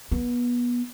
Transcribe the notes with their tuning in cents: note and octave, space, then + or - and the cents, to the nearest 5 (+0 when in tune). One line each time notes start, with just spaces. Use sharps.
B3 -25